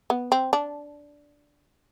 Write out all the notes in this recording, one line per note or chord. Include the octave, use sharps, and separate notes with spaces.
B3
C4
D4